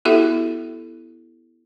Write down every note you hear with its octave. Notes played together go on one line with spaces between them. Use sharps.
B3 E4 F#4 G4 A4 E5